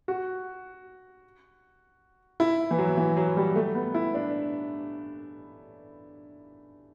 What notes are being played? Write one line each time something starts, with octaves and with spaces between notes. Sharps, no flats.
F#4
E4
E3
F#3
E3
F#3
G3
A3
B3
E4
D4